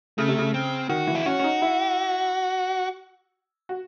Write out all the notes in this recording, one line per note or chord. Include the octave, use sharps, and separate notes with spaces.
C#3 A3
C3
C#3
C4
D#3 F#4
E3
E4
C#4 F#4
C#4
D#4
E4
F#4